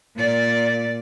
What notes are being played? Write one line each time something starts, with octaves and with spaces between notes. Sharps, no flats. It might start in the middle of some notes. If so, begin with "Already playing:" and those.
A#2 D5